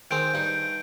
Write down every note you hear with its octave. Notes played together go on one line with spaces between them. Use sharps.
D#3 G#3 C4 G6 D7
G2 D#4